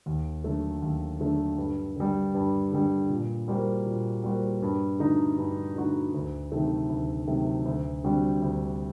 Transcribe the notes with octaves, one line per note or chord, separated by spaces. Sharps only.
D#2
D3 F#3 A3
D#2
D3 F#3 A3
G2
D3 G3
G2
D3 G3
A#2
G3 A#3 F#4 C5
A#2
G3 A#3 F#4 C5
G2
D3 A3 D#4 F#4
G2
D3 A3 D#4 F#4
D2
C3 D#3 F#3 A3
D2
C3 D#3 F#3 A3
D2
D3 G3 C4 F#4
D2